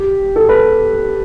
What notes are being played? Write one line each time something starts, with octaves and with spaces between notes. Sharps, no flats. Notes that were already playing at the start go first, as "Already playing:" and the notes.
Already playing: G4
A4
B4